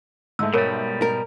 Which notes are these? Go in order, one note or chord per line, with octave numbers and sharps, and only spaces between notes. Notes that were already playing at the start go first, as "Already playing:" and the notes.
G#2 G#3 A3 E6
B2 G3 A#4 C#5
A#4